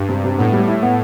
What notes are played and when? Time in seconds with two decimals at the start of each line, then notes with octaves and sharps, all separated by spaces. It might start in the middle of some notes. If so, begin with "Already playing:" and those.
Already playing: G2
0.09 C3
0.24 C3
0.38 A2 B3
0.53 G3
0.68 E4
0.83 B3